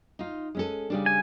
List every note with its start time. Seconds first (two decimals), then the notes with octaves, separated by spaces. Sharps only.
0.19 D#4 F4
0.55 G#3 C#4 A4
0.90 C#3 G3 D4
1.06 G#5